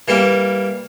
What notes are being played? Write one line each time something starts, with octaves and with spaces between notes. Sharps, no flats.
E3 G3 A#3